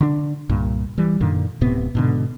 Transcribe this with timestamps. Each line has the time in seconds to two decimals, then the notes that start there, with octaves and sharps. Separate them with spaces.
0.01 D3 D4
0.49 C2 G2 A#2
0.98 E3 G3
1.20 F#2 A#2 D3 D#3
1.61 D1 A2 C3 B3
1.95 G#2 B2 D3